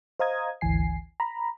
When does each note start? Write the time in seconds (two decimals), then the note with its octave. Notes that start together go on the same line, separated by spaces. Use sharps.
0.19 C5 D#5 F5 A#5 D#6 G#6
0.61 G#1 D2 E3 G#5 C7
1.20 A#5 B5